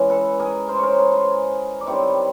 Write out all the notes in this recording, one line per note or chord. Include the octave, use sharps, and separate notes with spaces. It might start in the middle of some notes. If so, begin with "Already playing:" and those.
Already playing: E3 G#3 C#4
A4 B4
G#4 A#4
A#4 C5
A#4 C5 C#5
B4 C#5
A#4 C5
D5
D#3 G3 C4 E4 B4 C#5